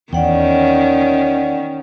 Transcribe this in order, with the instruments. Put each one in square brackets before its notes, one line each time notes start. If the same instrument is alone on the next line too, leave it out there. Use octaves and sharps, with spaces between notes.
[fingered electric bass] E2 [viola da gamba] D#3 C#4 [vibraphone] D5 F#5 G5